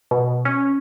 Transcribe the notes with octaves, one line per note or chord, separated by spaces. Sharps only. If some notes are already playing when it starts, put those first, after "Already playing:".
B2
C#4